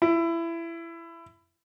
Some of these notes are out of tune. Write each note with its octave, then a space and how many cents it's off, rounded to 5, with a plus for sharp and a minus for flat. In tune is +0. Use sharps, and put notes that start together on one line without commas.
E4 +20